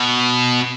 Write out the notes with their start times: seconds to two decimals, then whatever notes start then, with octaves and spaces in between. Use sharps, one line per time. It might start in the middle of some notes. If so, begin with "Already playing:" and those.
Already playing: B2